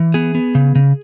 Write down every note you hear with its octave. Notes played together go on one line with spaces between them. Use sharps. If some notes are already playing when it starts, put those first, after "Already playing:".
Already playing: E3
B3 G#4
B3
C#3
C#3